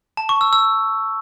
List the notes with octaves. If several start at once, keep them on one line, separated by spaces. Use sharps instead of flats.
A5
C#6
E6
E6